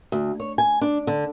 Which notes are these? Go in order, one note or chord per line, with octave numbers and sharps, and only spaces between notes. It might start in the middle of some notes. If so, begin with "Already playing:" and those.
D2
C#5
G#5
D4
D3